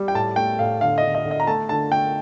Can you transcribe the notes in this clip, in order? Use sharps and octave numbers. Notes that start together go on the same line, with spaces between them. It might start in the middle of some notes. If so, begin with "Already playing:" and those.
Already playing: G3
G5
A2 A5
A3 G5
A2 F5
D3 F5
D#5
D3
D#5
D3
D#5
A#5
A3 A5
D3 A5
A3 G5